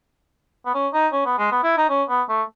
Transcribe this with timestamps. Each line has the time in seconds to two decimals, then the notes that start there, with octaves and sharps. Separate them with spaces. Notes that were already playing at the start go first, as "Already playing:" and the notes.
0.66 B3
0.74 C#4
0.94 D#4
1.13 C#4
1.26 B3
1.39 G#3
1.52 B3
1.64 E4
1.78 D#4
1.90 C#4
2.09 B3
2.29 A3